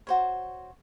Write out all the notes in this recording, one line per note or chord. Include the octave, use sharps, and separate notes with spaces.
F#4 C5 C#5